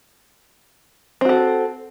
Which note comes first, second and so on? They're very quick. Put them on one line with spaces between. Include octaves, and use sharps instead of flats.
C4 F#4 A4